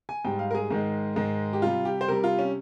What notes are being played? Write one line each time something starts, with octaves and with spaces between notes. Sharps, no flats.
G#5
G#2 G3 G5
F5
A#4
G#4
G#2 D#3 G#3
G#2 D#3 G#3
G4
C3 G3 F4
G4
C5
C3 G3 A#4
F4
C#4